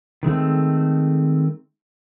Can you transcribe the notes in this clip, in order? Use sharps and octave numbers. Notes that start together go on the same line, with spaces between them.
D#3 G#3 A3 C4